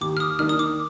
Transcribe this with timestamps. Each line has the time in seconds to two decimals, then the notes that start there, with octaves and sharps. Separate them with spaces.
0.01 D#2 D6
0.17 F6
0.20 D#6
0.39 D#3 A#3 D4 F6
0.49 D#6
0.59 D6